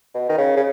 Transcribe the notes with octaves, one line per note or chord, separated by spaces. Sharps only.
B2
D#3
C#3
C#3